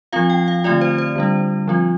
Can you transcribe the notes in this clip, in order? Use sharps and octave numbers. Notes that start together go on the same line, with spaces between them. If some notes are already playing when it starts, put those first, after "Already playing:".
F3 C4 F4 F5
G5
F5
D3 A3 C4 F4 D5
C5
C5
D3 G3 D4
F3 C4 F4